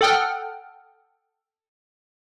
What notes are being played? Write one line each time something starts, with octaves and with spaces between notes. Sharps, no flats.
A4 F#5 G5 D#6 F6 F#6